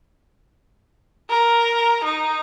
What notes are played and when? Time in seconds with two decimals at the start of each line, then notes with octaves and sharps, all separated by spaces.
1.30 A#4
2.04 D#4